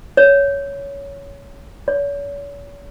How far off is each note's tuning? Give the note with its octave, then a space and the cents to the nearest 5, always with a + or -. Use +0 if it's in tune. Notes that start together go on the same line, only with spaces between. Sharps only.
C#5 +15
C#5 +40